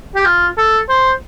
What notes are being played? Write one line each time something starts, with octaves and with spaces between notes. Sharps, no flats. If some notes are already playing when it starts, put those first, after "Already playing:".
G4
F4
A4
C5